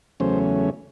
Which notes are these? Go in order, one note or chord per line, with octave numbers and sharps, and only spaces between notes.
E2 C#3 F#3 A3 C#4 C5